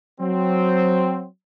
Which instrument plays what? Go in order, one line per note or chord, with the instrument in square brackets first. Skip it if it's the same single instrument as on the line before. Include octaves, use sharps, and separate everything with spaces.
[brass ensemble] F#3 C4